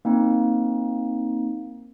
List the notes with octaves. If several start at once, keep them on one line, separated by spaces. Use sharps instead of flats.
A#3 C4 D#4